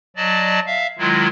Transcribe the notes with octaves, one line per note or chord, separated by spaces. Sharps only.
F#3 D5 D#5 A5
E5 F5
D#3 F#3 G#3 E4 F4